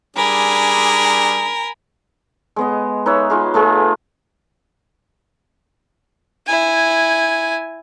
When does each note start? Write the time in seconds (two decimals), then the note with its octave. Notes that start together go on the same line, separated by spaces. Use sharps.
0.16 G3 D4 G#4 A#4 G#5 B5
2.56 G#3 B3 D#5
3.06 D#4 B4 C#5 E5
3.30 D#4 F4 F#4 G#4
3.54 A3 F4 G#4 B4
6.47 E4 G#5